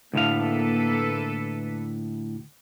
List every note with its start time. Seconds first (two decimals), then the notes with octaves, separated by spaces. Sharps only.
0.14 D2 A2 A#3 A4 B4 F5